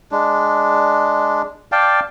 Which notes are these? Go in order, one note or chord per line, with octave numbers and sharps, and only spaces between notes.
G#3 D4
D5 F5 G5 A5